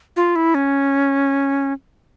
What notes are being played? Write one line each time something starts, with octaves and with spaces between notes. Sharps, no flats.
F4
E4
C#4